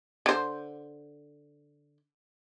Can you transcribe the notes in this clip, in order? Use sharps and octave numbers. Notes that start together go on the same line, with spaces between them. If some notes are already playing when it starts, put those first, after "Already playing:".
D3 C5